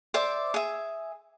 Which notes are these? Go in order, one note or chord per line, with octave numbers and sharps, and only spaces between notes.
C5 D5 E5 D6
G#4 E5